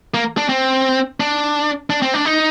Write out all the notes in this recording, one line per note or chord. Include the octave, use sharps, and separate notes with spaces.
A#3
D4
C4
D4
D4
C4
D4
D#4